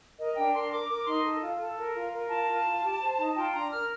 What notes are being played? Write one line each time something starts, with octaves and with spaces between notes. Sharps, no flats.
A#4 D#5
D4 G5
A#4 C6
A#4 D6
A#4 D6
D#4 C6
A4
F4
A4
A#4
F4
A#4
F4 A5
F4
F4
G4
C5
D#4
F4 G5
D4 A#5
A#4 F6